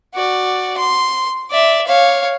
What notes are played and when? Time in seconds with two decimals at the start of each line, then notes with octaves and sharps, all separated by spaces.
0.14 F#4 D5
0.77 C6
1.51 D5 E5
1.87 C#5 F5